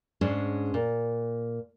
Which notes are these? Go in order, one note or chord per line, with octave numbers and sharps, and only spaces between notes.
G#2 G#3 C#4 D4
A#2